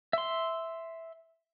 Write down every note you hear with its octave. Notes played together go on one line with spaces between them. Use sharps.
E5 C6